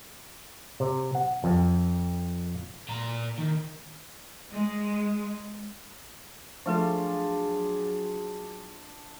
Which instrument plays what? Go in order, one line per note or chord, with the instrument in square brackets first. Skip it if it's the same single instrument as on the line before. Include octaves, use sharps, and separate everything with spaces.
[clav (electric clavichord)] C3
F#5
F2
[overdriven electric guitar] A#2 A#5
D#3
[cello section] G#3
[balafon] F3 A3 A4 [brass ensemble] F#3 G#4 [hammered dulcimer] D4 F4 D5